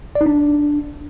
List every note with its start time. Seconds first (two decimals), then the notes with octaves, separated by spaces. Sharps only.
0.15 D5
0.21 D#4
0.26 D4